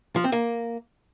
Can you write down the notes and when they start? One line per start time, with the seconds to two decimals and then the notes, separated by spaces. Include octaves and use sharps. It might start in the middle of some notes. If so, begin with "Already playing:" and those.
0.16 F3
0.24 C4
0.32 A#3